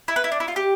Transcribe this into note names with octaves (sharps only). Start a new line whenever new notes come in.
E4
B4
E4
D4
E4
F4
G4